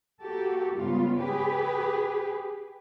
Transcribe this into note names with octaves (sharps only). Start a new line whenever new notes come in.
A#3 F#4 G4 A4
G#2 C#3 G3 B3 F4
G4 G#4 B4